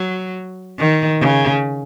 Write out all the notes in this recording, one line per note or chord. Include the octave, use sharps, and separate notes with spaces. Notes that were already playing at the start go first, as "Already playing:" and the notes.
Already playing: F#3
D#3
C#3